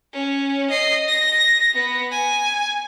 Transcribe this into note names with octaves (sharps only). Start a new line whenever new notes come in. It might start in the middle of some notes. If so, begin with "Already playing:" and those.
C#4
D#5 C7
A#6
B3
G#5